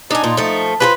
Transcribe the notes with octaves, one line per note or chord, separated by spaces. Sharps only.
D4 D#4 G#5
A#2 F4
F3 A3
F4 G4 B4 C5